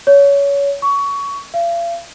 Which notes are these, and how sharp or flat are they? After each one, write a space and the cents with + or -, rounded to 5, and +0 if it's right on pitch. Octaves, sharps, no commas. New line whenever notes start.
C#5 +25
C#6 +20
F5 -40